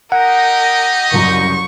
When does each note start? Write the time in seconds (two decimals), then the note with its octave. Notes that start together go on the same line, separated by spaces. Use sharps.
0.12 D#4 G4 A#4 D#5 F#5
1.12 F#1 C2 F#2 C#6